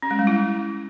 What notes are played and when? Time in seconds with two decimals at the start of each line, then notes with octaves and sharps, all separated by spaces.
0.02 C#4
0.11 G#3
0.19 G3
0.27 E4